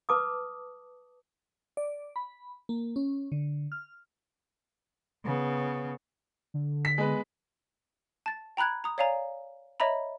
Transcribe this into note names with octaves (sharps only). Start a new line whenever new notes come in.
B4 A5 D6 D#6
D5
B5
A#3
C#4
D3
F6
C#3 B3
D3
B6
G#3 B3 B4
A5 A6
G5 A#5 B5 F#6 G#6
A#5 D#6
C#5 D5 F5 G#5 A#5
C#5 D#5 E5 A#5 B5